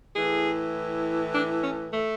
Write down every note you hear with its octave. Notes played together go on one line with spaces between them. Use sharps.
A2 E3 G#4
D4
C#4
A3